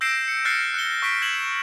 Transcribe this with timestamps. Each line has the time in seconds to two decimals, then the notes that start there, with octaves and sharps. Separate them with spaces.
0.01 E6 G6 A#6 C7 D7 E7
0.28 C#7
0.45 F6 F#6 A6 A#6 C7 C#7
0.74 F#6 C#7 G7
1.02 C#6 F6 B6 D7
1.22 G#6 E7 F#7